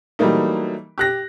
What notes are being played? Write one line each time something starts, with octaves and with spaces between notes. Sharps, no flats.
E3 F#3 G3 A3 A#3 D#4
G4 F#6 A#6